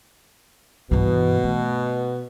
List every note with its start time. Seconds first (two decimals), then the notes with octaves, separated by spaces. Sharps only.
0.91 G2 B2 E3
1.44 A3